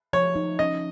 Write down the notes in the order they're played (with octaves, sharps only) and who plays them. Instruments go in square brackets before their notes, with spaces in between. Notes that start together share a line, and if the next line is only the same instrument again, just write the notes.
[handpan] F3 [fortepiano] C#5
[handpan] D#4
[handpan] C#4 [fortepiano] D#5